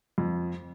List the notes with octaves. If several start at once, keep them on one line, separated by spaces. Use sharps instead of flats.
F2